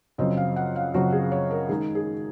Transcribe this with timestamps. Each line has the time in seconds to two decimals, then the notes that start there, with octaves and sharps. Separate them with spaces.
0.18 F#2 C#3 F3 C4 F4 D#5
0.37 F5
0.56 F#5
0.76 F5
0.94 F#2 C#3 F3 C4 F4 F#4
1.12 G#4
1.32 C#5
1.51 A#4
1.69 D#3 G#3 D#4 G#4
1.95 G#4